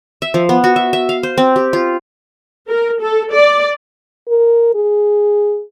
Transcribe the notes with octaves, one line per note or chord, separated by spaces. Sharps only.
E5
F3
B3
F#4
E5
E5
F5
C5
C4
G4
F4
A#4
A4
D5
A#4
G#4